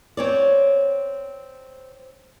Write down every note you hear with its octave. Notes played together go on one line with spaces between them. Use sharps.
C4 C#5 D5